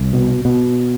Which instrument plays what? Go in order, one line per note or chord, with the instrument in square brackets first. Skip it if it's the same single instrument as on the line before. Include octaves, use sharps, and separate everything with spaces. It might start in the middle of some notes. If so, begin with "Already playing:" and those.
Already playing: [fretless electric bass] C2
B2
B2